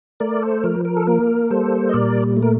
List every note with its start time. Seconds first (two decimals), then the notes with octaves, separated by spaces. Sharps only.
0.20 A3 A#4 D5
0.42 A4 C5
0.64 F3 A#4
0.85 A#4
0.97 A4
1.07 A#3 A#4
1.51 G3 A4 C5
1.89 D#5
1.93 A#2 A#4 D5
2.37 A3
2.43 A#4